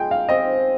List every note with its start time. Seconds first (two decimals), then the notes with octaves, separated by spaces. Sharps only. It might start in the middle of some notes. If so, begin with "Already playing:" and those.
Already playing: G#3 F4 G5
0.11 F5
0.29 C4 D#5